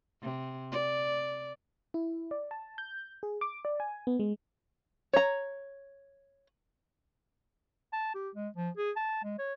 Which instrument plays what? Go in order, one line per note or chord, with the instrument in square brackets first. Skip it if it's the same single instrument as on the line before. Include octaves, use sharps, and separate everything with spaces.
[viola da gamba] C3
D5
[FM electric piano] E4
D5
A5
G6
G#4
D6
D5
G#5
B3
G#3
[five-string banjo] C#5 A#5
[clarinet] A5
G4
G#3
F3
G#4
A5
G#3
C#5